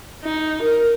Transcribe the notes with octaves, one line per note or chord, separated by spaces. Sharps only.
D#4
A#4